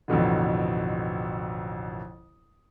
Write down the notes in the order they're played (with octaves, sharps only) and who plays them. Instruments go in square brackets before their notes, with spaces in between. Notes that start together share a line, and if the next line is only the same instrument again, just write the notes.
[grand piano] A1 F2 B2 D3